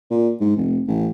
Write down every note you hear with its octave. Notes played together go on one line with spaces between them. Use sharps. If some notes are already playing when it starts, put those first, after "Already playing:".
A#2
G#2
F1
A1